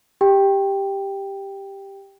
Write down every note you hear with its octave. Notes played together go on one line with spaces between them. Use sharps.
G4 G5